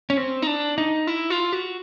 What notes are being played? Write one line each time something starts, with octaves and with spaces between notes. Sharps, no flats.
C#4
C4
D#4
D4
D#4
E4
F4
F#4